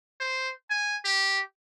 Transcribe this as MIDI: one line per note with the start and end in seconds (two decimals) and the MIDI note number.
0.20 0.51 72
0.70 0.98 80
1.05 1.41 67